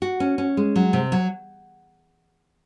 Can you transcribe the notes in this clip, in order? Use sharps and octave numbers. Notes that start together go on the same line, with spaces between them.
F#4
C#4
C#4
G#3
F#3
C3
F#3